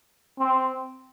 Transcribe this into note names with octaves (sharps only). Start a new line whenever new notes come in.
C4